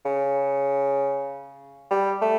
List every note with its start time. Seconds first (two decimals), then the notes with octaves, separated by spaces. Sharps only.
0.05 C#3
1.90 G3
2.21 A3